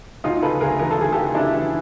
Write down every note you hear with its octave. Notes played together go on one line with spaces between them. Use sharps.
D2 D#4 F4
C#3 A4 B4
D2 G#4 A#4
E3 A#4
A4
D2 G#4
C#3 G4 A4
D2 D4 E4
E3